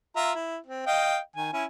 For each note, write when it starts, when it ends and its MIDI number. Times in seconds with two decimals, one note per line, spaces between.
0.16 0.32 65
0.16 0.32 76
0.16 0.32 82
0.35 0.58 64
0.66 0.86 60
0.87 1.18 75
0.87 1.18 77
0.87 1.18 79
1.36 1.51 51
1.36 1.51 80
1.53 1.65 61
1.53 1.65 64
1.53 1.65 80